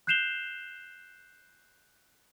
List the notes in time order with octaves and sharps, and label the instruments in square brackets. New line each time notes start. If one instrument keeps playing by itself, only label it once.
[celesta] F#6 G6 C7 E7 F7 G7